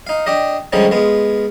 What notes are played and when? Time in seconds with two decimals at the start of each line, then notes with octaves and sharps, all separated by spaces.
0.07 D#4 F5
0.26 D4 G4 D#5
0.73 D3 F3 G3 G#3 C#4 D#4
0.91 G#3 B3 F4